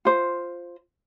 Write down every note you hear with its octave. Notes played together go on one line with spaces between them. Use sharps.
F4 C5